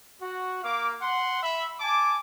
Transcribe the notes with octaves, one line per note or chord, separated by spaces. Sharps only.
F#4
A#3 F5 D6
F#5 C6
E5 B5
G#5 A5 D6